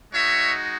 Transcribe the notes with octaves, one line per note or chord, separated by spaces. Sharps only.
G#3 D#4 F#4 C#5 E5